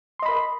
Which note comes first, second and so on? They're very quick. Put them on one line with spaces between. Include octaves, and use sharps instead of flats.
C6 D#5 B5 A#4